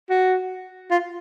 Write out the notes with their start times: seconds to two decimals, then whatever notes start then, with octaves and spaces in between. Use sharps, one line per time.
0.10 F#4
0.91 F4